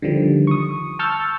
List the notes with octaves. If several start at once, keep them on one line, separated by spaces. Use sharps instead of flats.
D3 D#3 F3 G3
C#6 D#6
A5 C#6 E6 F6 G6 A6